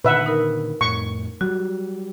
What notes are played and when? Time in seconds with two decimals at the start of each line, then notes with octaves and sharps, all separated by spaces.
0.05 A#2 D3 D#3 B4 E5 F#5
0.26 D#4 A#4
0.81 F2 A2 C#6
1.41 F#3 G3 F#4